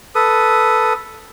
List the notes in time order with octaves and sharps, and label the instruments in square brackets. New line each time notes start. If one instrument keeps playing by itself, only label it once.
[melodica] A4 B4 D#6